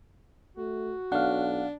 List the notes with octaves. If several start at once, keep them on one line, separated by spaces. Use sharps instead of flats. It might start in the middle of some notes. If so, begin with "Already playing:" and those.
A3 F#4
B1 D4 F5 F#5